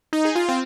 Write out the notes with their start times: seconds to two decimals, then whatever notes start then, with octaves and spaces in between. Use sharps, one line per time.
0.13 D#4
0.25 G#4
0.35 F4
0.49 C4